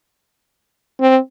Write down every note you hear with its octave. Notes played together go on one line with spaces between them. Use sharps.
C4